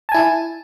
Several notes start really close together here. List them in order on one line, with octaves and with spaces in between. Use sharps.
A5 G#5 E4